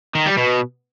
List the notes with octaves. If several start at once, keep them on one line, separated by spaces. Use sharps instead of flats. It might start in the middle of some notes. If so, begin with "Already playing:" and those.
D#3
G3
B2